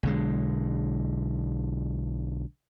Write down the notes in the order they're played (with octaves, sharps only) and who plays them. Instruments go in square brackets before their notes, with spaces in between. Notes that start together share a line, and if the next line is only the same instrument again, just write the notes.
[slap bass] B1 D3 G#3